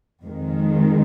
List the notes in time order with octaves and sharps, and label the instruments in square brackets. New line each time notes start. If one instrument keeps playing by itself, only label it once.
[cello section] F2 D#3 G#3